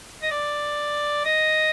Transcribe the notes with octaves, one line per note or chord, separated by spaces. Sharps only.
D#5
D5
D#5